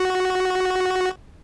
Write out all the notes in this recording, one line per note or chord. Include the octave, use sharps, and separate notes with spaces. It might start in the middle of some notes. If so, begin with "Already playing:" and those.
Already playing: F#4